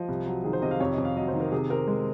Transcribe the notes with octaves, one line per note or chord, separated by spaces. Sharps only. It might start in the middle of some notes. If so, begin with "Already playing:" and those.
Already playing: F3 D#5
C2
F#3
D#3 G#4
C5
C3 D#5
F5
F2 C#5
D#5
F2
F5
F#3 D#5
C5
D#3
A#4
C3 G#4
C4 A#4
G#3